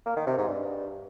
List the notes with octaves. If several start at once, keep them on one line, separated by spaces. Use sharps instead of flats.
A#3
D#3
C3
G#2
G2